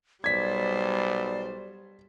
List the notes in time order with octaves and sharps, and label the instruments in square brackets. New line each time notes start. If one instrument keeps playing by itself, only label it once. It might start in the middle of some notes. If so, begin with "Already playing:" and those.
[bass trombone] B1 [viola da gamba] G3 C5 [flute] D5 [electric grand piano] G#6 B6